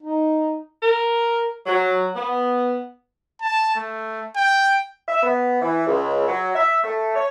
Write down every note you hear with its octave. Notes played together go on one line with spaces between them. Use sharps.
D#4
A#4
F#3
B3
A5
A3
G5
E5
B3
E3
C#2
F#3
E5
A3
C#5